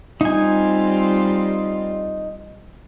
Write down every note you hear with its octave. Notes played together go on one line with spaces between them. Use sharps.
G3 C4 D#4 F4 G#5